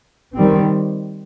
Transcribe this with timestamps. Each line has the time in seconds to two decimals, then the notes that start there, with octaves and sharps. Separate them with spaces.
0.34 D#3 G3 C4